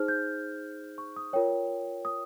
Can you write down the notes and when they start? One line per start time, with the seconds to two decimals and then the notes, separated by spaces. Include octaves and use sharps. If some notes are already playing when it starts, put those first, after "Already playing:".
Already playing: D#4 G#4 C5 F6
0.08 G6
0.98 C#6
1.16 D#6
1.33 F4 A#4 C#5 G5
2.05 D#6